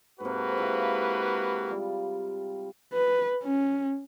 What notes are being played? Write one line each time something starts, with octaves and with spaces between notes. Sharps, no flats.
G#2 C3 A#3 F#4 B4
E4 E5 F5
G3 F4
B4
C#4